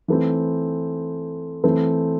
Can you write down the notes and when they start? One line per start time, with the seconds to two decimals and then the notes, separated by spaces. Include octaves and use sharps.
0.08 E3 A3 C4
1.64 E3 A3 C4